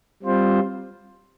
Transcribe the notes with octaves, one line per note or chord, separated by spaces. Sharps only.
G3 C4 F4 C5